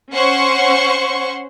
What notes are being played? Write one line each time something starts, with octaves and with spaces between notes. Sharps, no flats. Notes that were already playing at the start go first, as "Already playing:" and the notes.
C#4 C5 F#5 C6 C#6